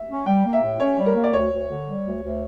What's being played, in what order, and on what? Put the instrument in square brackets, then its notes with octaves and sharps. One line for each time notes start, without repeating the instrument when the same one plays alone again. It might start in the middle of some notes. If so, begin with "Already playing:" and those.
Already playing: [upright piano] E5
[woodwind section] C#4
[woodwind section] G3 [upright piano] G5
[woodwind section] A#3
[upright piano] E5
[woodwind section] A2
[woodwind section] C#4 [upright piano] C#5
[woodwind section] G3
[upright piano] A#4
[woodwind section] A#3
[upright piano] D5
[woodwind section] D2 [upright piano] C#5
[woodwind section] D2
D3
G3
D2
D2